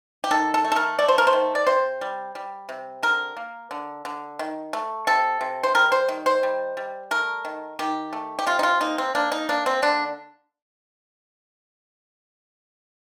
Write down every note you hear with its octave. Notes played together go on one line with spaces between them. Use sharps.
G4
D#3 A4
A4
A3
A4
A#4
A3 D5
C5
A#4
C5
D#3
D5
C3 C5
G3
G3
C3
D3 A#4
A#3
D3
D3
D#3
A3
C3 A4
C3
C5
G3 A#4
C5
D#3
C5
G3
G3
A3 A#4
D#3
D#3 G4
A3
G4
C3 F4
D#4
F4
A#3 D#4
C4
A#3 D4
D#4
A#3 D4
C4
D3 D4